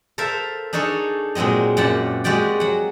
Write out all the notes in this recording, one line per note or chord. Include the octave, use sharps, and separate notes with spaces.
A4 A#4 C5 E5 F5
D4 D#4 G#4 A4 C#5
A#2 F#3 G#3 C4 D#5
F#2 A#2 D5 F#5 G5 A5
G#3 F#4 G4 D5 G5
F#3 F#5